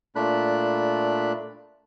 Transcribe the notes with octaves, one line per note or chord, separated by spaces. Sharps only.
A#2 A3 D4 B5 F#6